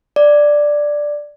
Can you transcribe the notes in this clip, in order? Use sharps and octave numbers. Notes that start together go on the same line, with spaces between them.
D5